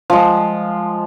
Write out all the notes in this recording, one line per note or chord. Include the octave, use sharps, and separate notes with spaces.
F3 G#3